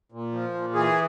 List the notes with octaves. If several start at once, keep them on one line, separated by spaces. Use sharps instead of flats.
A#2
F3
A#2
E3 G#4